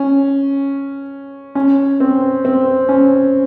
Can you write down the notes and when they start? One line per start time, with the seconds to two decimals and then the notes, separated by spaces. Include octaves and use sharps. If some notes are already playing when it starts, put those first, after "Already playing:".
Already playing: C#4
1.55 C#4
2.00 C4
2.45 C4
2.89 C#4